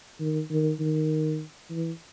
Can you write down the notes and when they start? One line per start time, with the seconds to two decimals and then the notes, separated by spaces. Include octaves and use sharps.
0.20 D#3
0.50 D#3
0.80 D#3
1.70 E3